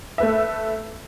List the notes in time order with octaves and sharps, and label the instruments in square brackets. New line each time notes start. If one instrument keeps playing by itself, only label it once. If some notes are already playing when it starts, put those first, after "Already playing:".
[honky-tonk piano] A3 B4 E5